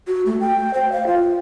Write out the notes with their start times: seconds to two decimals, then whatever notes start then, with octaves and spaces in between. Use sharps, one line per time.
0.08 F#4
0.26 A3
0.41 G5
0.74 C5
0.92 F5
1.07 F4